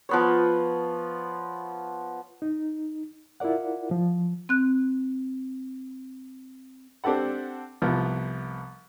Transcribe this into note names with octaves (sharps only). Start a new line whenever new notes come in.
F3 B3 C#5
D#4
E4 F4 A#4 D5 F#5
F3
C4 F#6
C4 D4 G4 A4 F#5
C2 F3 B3